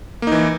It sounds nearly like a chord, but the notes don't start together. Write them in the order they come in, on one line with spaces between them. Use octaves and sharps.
A#3 D#4 E3